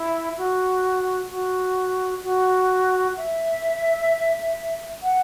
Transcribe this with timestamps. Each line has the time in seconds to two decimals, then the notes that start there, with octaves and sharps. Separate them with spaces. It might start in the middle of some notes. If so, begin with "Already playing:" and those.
Already playing: E4
0.38 F#4
1.30 F#4
2.24 F#4
3.17 E5
5.03 F#5